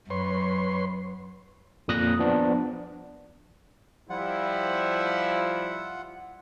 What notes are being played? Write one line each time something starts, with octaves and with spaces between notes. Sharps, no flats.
F#2 B4 C#5 C6
F2 A#2 D#6 F#6 A#6
F3 B3 D4
F3 G3 E4 F4 F#5